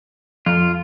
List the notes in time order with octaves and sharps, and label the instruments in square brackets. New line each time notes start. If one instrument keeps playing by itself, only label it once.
[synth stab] F2 [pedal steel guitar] F4